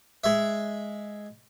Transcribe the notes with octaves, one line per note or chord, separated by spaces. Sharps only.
G#3 E5